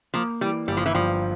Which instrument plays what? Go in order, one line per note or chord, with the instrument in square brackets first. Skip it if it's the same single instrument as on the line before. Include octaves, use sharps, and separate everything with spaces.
[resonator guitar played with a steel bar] F3 [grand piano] A#3
[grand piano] E3 [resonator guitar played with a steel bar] G3
[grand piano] G1 [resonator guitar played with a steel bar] G3
[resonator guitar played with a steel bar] F3
E3
[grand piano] G2 [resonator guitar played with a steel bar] F3